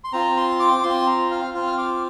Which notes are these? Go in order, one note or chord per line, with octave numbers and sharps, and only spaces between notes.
C6
C4 F4 A#5
C6
D6
C4 F4 C6
A#5
F5
C4 F4 F5
F6
D6